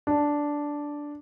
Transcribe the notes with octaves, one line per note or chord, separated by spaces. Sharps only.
D4